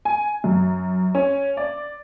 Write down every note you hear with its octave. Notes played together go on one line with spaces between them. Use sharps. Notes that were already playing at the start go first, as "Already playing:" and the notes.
G#5
F#2
C#4
D5